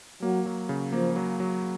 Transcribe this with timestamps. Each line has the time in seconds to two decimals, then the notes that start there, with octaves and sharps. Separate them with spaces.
0.22 F#3 A#3
0.46 F#3
0.69 C#3
0.92 F3 A#3
1.16 F#3
1.40 F#3